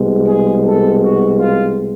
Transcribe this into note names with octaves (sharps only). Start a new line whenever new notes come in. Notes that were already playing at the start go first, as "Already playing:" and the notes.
Already playing: C2 B2 G#3
G#4
A4
F#4
F4